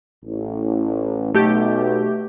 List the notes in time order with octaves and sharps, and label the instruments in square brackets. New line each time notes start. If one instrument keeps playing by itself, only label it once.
[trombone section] A1
[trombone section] B1 B2 [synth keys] A3 G4 G6